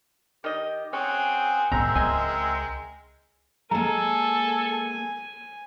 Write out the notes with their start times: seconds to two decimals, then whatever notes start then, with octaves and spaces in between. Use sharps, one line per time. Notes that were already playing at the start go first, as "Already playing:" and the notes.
0.44 D#3 G4 D#5
0.93 C4 C#4 G#4 F#5
1.72 G#2 G#3 B3 C4 A#4 C5 E5 A#5
1.95 C#2 D#5 G#5
3.71 G#3 A#3 A4 G#5 A#5